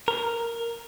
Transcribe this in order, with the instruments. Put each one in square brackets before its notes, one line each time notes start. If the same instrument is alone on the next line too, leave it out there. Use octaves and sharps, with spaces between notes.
[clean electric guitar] A#4